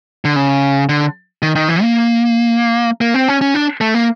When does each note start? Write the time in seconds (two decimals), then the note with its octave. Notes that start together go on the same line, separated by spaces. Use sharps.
0.25 D3
0.36 C#3
0.89 D3
1.42 D#3
1.55 D#3
1.69 E3
1.82 A#3
3.01 A#3
3.14 C4
3.28 C#4
3.41 C#4
3.54 D4
3.81 A3
3.94 A#3